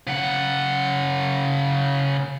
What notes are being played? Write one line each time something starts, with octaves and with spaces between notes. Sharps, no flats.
C#3 F#5